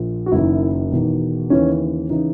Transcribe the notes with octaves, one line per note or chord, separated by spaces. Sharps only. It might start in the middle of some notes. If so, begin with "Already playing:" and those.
Already playing: A#1 A#2
F#4
F#1 F#2 D#3 E4
E1 E2 D#3
D#2 C#3 E3 C#4
C#3 E3 D#4